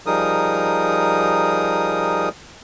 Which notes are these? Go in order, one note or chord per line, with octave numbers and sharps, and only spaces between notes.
F3 G3 D#4 G#4 A#4 D#6